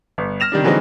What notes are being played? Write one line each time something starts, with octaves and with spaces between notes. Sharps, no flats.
G1
F6 A#6 E7 F7
C3 D#3 G3 D4
D3 E3 F#3 G#3 C4 D#4